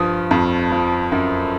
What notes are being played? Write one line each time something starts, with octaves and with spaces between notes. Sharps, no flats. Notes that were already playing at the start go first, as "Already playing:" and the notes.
Already playing: G2 F3 D#6
F2
F3
F#2